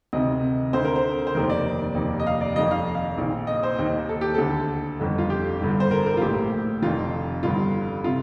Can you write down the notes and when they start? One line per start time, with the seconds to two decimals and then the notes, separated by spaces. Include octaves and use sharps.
0.13 D2 C3 D#3 D#5
0.73 D2 D3 C5
0.85 A#4
0.96 C5
1.27 C5
1.35 F1 D#2 D#3 A#4
1.50 D5
1.95 F1 D#2 D#3
2.20 D#5
2.27 F5
2.41 D5
2.56 F1 F2 D#3 D#5
2.71 F5
2.95 F5
3.18 A#1 A#2
3.47 D#5
3.63 C5
3.79 D#2 D#3
4.09 A4
4.21 G4
4.35 D2 D3 A4
5.00 G1 F2 D3
5.18 F4
5.30 G4
5.61 G1 G2 D3
5.80 C5
5.91 A#4
6.06 A#4
6.17 F4
6.22 A#1 A2 G4
6.82 F1 F2 D#3 F4
7.43 G1 G2 D3 F4
8.04 C3 F4